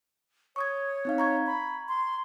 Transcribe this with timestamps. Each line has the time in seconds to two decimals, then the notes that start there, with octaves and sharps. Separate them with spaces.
0.56 C#5 C#6 D#6 G#6
1.05 C4 D#4 F5
1.18 A#5 C#6 G#6
1.46 B5
1.88 C6